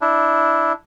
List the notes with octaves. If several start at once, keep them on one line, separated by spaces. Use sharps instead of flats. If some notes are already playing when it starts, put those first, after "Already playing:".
D4 E4